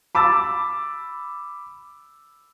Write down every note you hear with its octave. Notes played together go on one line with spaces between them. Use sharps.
B5 D6 E6 A6